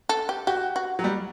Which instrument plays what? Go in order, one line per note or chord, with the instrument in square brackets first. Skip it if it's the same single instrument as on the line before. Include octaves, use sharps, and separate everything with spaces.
[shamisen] A4
G4
[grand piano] F#4 [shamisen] G4
[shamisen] F#4
[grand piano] F#3
G3